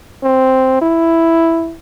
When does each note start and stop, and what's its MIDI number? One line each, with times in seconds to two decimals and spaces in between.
0.23 0.78 60
0.82 1.75 64